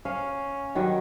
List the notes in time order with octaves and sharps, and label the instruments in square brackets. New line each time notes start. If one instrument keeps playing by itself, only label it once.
[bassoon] C#4 [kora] F5
[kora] D#3 F#3 F#4 [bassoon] G3